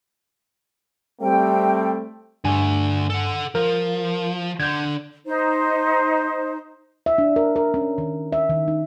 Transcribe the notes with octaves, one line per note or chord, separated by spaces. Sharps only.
G3 A3 C4 G5
G2 D3 A3 G#5
A4 F#5
F3 A#4
D3 G6 G#6
D#4 C5
E5
D4
A#4
A#4
C#4
D#3
E5
D#3
D#4